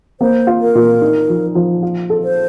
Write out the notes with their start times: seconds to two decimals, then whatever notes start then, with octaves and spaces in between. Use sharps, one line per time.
0.21 A#3 C5
0.47 F4
0.61 A#4
0.75 A#2
1.02 D#4
1.29 F3
1.55 F3
1.82 F4
2.10 A4
2.23 C5